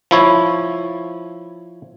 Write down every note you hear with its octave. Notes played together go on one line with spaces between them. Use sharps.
F3 E4 C#5